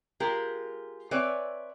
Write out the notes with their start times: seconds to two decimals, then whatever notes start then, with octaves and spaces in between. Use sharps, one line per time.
0.20 G#3 F4 G4 A#4
1.11 C4 B4 C#5 D5 E5 G#5